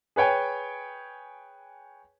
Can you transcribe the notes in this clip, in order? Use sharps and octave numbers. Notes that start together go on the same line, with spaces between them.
G#4 B4 C#5 G5 G#5